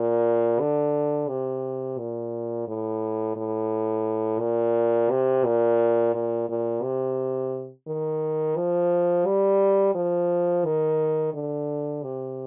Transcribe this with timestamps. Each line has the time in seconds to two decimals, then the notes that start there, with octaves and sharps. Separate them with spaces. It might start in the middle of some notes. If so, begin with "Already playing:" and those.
Already playing: A#2
0.60 D3
1.29 C3
1.98 A#2
2.68 A2
3.36 A2
4.40 A#2
5.10 C3
5.45 A#2
6.14 A#2
6.49 A#2
6.83 C3
7.87 D#3
8.56 F3
9.26 G3
9.95 F3
10.65 D#3
11.34 D3
12.03 C3